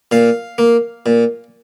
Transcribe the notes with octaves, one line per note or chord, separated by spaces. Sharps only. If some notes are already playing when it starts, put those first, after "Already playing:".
A#2 F5
A#3
A#2